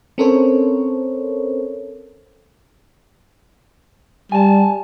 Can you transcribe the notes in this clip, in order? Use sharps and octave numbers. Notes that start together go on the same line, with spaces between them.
C4 C#4 A4 A#4 C5 C#5
G3 G#5 A5